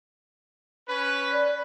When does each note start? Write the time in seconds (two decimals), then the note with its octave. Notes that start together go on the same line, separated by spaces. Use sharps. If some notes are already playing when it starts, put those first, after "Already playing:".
0.88 C#4 B4
1.32 D5